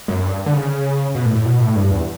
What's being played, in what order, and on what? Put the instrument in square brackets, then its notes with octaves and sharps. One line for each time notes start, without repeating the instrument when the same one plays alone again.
[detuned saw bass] F#2
G2
D3
C#3
B2
A2
A2
B2
A2
G2
E2